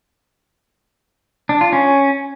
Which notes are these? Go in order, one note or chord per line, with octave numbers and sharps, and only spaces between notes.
D4
F4
C#4